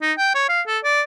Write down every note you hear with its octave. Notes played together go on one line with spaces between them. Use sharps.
D#4
G5
C#5
F5
A4
D5